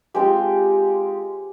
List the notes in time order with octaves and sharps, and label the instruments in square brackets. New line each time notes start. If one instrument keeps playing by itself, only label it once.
[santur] G#3 C4 F4 G4 G5